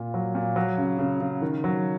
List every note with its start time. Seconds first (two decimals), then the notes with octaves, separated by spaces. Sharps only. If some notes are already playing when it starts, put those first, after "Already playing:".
Already playing: A#2 F4
0.14 F#3
0.35 A#2
0.56 F#3
0.78 C#3
0.99 C#3
1.21 C#3
1.42 D#3
1.64 F#3